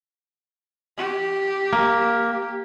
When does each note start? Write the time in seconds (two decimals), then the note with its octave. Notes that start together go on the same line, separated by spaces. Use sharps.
0.97 G4
1.73 A#3